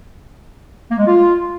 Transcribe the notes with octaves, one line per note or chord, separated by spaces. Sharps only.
A#3
G#3
F4